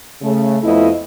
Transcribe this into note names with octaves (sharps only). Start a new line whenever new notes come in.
C#3 A3
F2 A3 B3 E4 F4 D#5